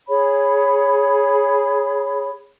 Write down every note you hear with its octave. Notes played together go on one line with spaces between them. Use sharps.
G#4 C#5 B5